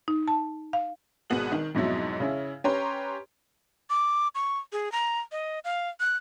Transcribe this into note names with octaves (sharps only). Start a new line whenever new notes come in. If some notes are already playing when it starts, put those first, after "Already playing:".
D#4
A5
F5
G#1 B2 B3 G#4 F#7
D#3
F2 G#2 B2 F#3 E4
C#3 C#4 E4
C#4 G4 B4 C#5 A#5 C6
D6
C#6
G#4
A#5
D#5
F5
F#6